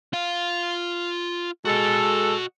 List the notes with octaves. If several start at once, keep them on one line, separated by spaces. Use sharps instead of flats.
F4 F5
G#3 F#4 A4 D#5